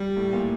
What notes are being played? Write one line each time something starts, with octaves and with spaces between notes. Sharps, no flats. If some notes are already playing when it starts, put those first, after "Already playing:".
Already playing: G3
A2
A#2